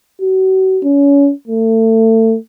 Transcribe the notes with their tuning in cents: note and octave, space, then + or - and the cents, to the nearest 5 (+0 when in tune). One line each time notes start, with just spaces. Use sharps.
F#4 +35
C#4 +30
A3 +30